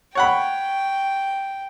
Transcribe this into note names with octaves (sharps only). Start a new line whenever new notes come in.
C#5 F#5 G5 B5